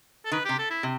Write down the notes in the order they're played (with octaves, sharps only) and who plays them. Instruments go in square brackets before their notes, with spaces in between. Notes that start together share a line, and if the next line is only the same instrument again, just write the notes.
[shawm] A4
[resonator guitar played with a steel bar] D#3 [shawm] B4
[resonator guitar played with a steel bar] C3 [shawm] G4
[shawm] A4
E4
[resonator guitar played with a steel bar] C3